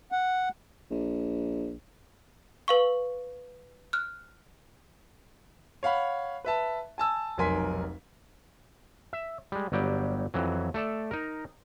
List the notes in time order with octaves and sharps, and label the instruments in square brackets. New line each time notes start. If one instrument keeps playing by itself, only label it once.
[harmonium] F#5
[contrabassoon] A#1
[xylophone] B4 F5 C#6
F6 F#6
[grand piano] C#5 F5 F#5 B5
B4 E5 A5
G#5 A5 E6
F1 B1 A#4 G#5 C6 B6
[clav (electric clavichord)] E5
G3 G#3
G1 F#3 G3 G5
F2 E3 F#3
A3 A4 D5 A5
D#4 A#4